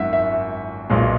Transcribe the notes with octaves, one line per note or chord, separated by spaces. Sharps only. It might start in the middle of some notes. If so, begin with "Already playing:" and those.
Already playing: G#1 F#2 D#3 E5 F#5
E5
B1 A#2 G#3